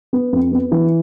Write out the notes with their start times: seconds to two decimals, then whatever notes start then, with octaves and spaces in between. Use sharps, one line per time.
0.13 B3
0.32 F2
0.52 B3
0.72 E3